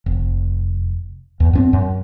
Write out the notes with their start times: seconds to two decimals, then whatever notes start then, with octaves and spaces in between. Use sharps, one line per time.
0.06 F1
1.40 E2
1.53 F#2 B3 C4
1.73 F#2